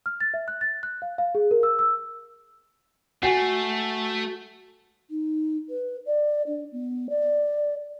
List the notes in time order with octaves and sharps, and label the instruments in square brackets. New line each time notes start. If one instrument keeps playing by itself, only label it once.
[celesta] F6
A6
E5
F#6
A6
F#6
F5
F5
G#4
A#4
E6
E6
[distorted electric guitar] A3 [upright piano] F#4 [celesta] G#5 C7
[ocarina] D#4
B4
D5
D4
B3
D5